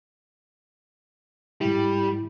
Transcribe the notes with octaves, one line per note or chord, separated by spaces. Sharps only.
G#2 G3 E4